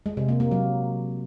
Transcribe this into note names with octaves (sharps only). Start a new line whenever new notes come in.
G#3
C3
A#3
A#3
F#3